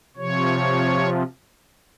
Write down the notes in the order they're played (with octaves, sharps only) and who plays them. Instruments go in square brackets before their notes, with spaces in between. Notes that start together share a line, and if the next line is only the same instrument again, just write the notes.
[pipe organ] C3 F3 C#5